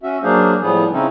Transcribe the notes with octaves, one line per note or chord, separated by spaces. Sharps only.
C#4 F#4 E5
F#3 A#3 D4 G#4 C5 F5
A2 F3 G3 B3 G#4
C#3 C4 C#4 D#4 E4